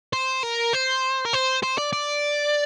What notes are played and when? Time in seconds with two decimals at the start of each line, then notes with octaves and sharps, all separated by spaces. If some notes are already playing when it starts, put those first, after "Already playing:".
0.13 C5
0.43 A#4
0.73 C5
1.25 A#4
1.33 C5
1.63 C5
1.78 D5
1.93 D5